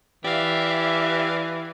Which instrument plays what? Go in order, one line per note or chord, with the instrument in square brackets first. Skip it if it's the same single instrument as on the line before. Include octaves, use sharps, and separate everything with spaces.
[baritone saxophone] E3 [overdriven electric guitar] G4 [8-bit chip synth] D5 F5 [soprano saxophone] E5